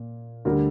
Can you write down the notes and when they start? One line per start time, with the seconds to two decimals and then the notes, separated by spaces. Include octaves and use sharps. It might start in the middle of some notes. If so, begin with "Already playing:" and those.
Already playing: A#2 A#3
0.45 D2 D3 G3 A#4